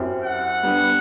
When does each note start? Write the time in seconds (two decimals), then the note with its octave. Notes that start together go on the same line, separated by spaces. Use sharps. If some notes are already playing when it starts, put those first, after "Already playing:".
Already playing: F#2 F#3 C4 E4 G4
0.24 F#5
0.63 G3 B3 D4